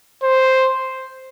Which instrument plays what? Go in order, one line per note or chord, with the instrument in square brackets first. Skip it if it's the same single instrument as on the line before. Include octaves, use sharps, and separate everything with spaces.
[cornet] C5